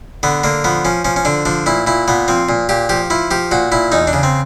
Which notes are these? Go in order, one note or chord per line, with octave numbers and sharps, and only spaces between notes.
D3 B3
D3 A#3
F3 B3
F3 C#4
F3 C#4
C#4
D3 D4
F3 D4
A#2 E4
A#2 E4
A#2 B3
F3 C4
A#2
A#2 G4
F3 G4
F3 E4
F3 G4
A#2 F#4
A#2 E4
E2 D#4
D4
C#3
C4